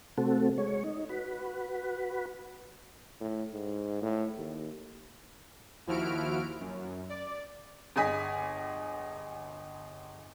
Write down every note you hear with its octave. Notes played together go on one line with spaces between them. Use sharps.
C3 A3 C4 F#4 A4
G#3 C#5
D#4
F#4 B4
A2
G#2
A2
D#2
D#2 F3 E4 F#4 F6 D7
F#2
D5
G1 G#4 D#5 G#5 B6